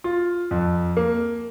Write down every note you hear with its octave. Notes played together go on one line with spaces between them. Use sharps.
F4
F2
A#3